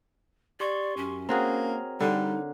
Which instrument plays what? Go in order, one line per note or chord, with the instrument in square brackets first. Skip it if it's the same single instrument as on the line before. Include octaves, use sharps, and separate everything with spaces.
[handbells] G4 C6 C#6 [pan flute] D5
[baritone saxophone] F#2 [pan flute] C#4
[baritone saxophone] A#3 [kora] C4 F#4 G#4 [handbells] A#4 C#5 A#5
[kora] D3 [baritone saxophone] G3 [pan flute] D#4